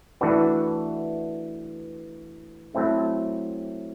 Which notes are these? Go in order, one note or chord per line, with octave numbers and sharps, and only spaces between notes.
E3 A3 D4 F#4 B4
F#3 A3 C4 E4